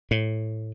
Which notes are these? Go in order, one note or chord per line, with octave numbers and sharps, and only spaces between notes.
A2